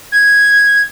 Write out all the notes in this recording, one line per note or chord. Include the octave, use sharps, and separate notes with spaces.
G#6